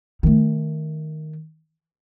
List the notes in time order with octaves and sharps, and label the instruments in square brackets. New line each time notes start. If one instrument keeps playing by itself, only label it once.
[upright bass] D#3 A3